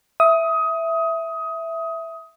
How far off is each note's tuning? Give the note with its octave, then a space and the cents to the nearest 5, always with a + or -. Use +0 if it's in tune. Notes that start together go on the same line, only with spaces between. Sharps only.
E5 +0 D#6 +20